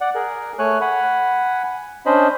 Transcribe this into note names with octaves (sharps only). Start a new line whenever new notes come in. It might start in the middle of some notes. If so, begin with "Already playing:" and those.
D5 F#5
G#4 A#4
A3 C#5 G#5 F#6
F#5 G#5 B5
C#4 D4 C5 D#5 B5